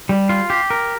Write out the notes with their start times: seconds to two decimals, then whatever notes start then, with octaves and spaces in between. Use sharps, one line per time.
0.09 G3
0.29 F4
0.50 G4
0.70 A#4